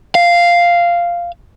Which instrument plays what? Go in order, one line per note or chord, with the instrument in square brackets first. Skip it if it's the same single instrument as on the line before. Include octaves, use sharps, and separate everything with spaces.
[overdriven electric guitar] F5